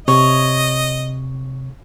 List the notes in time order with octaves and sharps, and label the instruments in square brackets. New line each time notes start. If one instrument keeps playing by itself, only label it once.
[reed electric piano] C3 [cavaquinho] C#5 [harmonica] D#5